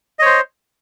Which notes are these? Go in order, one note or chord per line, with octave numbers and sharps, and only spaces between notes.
C5 C#5 D#5